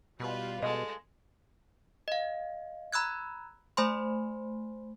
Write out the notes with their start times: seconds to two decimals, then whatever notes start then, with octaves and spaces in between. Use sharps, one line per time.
0.20 B2 G3 F4 B4
0.62 B2 G#3 A4 D#5
2.08 D#5 F5
2.92 A#5 B5 E6 F#6 G#6
3.77 A3 C5 G#5 B5 C6